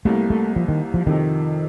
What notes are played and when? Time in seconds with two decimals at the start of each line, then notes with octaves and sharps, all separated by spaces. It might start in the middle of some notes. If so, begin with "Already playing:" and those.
0.05 C2 C3 G3 A3 A#3
0.30 A3
0.56 F3
0.68 D#3
0.94 F3
1.07 F2 C3 D#3 F3